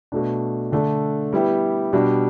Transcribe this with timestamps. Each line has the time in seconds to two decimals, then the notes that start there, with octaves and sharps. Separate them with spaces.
0.12 B2 A3 D4
0.72 D3 A3 D4
1.33 G3 B3 E4 G4
1.93 B2 G3 D4